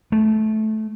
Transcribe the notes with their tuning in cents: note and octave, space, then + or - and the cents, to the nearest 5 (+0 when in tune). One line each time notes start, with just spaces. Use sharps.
A3 -15